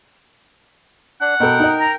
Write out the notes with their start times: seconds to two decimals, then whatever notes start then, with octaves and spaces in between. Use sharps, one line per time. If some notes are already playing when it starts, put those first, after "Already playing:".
1.21 D4 F#5
1.40 B2 A4 A#4 G5
1.60 D#4 D#5
1.80 A#5